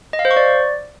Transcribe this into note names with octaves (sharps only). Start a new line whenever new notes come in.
D#5
F5
C5
C#6
D5